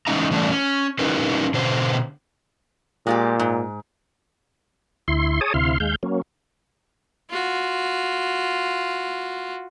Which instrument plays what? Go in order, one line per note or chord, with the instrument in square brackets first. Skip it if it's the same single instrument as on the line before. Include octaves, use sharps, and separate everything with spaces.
[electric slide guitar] E3 G#3 C#4 D#4 E5 A#5
E3 G3 A3 C#4 D4
C#4
C#4 D#4 E4 G4 A#4 B4
B2 D3 C5
[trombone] A#2 [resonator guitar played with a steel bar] G#3 F4 G4
[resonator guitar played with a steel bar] G#2
[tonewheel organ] D2 E4 C6
G#4 C#5 A5 D#6
D2 C3 E4 F5 C6
D#2 G#3 F5 G6
F#3 A#3 C#4
[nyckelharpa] F4 F#4